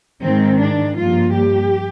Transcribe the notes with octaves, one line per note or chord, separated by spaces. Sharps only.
G#2 D#3 G#3 C4
D4
G2 F3 A#3 F4
G4